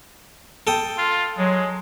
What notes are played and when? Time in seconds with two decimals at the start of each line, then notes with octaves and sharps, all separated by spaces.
0.67 A4 G5 D#6
0.98 F4
1.38 F#3 G#3